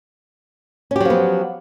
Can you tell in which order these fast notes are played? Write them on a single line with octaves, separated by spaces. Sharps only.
C#4 G4 F#3 F3 B3